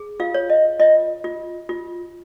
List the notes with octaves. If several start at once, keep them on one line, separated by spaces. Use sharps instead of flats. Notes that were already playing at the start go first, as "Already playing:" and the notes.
Already playing: G#4
F4 F5
C#5
D#5
F4 D#5
F4
F4